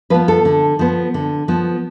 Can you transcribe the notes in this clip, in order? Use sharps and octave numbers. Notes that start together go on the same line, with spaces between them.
F3 B3 B4
A4
D3
F3 B3
D3
F3 B3